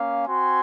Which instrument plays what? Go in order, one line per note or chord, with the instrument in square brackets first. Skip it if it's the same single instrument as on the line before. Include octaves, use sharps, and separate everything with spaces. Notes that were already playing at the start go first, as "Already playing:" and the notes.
Already playing: [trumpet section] A#3 C#4 F5
C4 F#4 G#5 C6